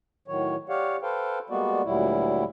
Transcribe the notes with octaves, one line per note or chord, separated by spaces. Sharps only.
A2 D#3 F#3 C#5
G4 C#5 D5 F5 F#5
A4 B4 C5 F5 G5
G3 G#3 A#3 B3 F#4 D5
D2 A#2 F#3 G3 E4